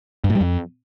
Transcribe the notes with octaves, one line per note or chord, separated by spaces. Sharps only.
G2
A2
G3
F2